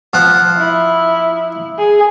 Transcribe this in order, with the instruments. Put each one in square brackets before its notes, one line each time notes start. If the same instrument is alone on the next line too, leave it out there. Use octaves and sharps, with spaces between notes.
[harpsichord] F3 F#5
[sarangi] E4
G#4